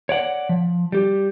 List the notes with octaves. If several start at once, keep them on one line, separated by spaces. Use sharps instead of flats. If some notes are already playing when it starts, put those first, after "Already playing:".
C#5 D5 F#5
F3
G3 G4